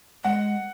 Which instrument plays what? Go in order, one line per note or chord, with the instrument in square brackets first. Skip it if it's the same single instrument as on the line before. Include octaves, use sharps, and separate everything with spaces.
[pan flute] G#3 [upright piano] F#5